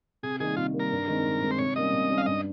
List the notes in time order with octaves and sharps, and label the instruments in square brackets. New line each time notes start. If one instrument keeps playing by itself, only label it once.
[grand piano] C3 [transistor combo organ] G#4
[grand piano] D#3 G3 A#3 [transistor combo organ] G#4
[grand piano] C3 [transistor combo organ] F4
[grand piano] D#3 G3 A#3
[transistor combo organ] A#4
[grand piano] G2
D#3 G#3 C4
G2
D#3 G#3 C4
[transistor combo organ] C5
[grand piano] C3 [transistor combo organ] C#5
[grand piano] G3 A#3 C#4 [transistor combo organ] D#5
[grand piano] C3
G3 A#3 C#4
[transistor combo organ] F5
[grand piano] G2 [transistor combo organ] D#5